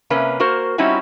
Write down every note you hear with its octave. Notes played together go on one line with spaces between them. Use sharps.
C3 A#3 C#4 B4
A#3 F#4 A#4 C5
G3 C4 C#4 D#4 E4 F#4